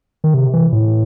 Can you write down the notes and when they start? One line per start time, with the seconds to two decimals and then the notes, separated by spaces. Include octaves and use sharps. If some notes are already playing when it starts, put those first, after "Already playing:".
0.24 D#3
0.34 C3
0.53 E3
0.72 A2